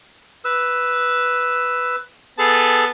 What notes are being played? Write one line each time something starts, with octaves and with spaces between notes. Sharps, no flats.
B4 E6
B3 G#4 A4 A5